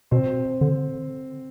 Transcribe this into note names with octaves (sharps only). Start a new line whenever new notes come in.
B2 C4 C5
D3